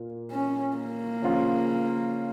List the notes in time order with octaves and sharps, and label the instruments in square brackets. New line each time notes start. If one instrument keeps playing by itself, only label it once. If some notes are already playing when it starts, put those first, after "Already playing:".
Already playing: [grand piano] A#2 A#3 F4
[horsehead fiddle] C#4
A#3
[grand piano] C#3 F3 C#4 F4